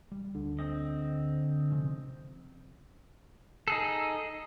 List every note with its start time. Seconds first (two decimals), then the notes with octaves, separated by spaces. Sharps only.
0.12 G3
0.35 D2 D3
0.59 C4 D#5
1.71 C3 F3 C#4
3.68 D#4 G#4 A4